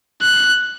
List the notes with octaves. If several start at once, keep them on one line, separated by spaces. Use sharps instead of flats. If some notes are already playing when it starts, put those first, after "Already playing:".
F#6